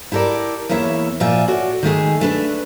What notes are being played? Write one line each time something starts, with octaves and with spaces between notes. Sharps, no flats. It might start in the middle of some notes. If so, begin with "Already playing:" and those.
E4 G4 A4 A#4 D5
E2 A#3 E4 C#5 E5
A#2 F3 F4 D5 E5 G#5
F#4 A4 C#5 D5
D#3 G#3 A3 G#4
A3 D4 B4